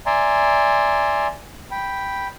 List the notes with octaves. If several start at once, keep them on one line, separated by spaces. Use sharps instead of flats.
D5 E5 G#5 A#5 C6
G5 B5